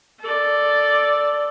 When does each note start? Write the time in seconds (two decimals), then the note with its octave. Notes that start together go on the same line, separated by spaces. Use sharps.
0.20 A4 D5